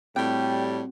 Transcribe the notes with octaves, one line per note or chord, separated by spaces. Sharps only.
A2 G3 C4 F#4 G5